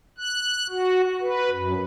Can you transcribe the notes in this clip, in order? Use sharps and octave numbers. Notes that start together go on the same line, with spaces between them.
F#6
F#4
B4
F#2